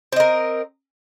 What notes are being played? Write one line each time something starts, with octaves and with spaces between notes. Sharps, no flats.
C4 A#4 D#5